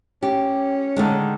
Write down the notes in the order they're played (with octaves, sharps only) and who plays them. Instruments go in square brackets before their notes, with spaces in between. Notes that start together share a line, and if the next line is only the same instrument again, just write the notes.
[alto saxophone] C#4 [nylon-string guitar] G4
[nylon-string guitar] D3 D#3 G#3